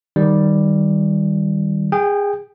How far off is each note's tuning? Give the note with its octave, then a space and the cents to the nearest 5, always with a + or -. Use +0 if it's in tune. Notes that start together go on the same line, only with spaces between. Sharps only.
D#3 +0 G3 +0
G#4 -25 G5 +0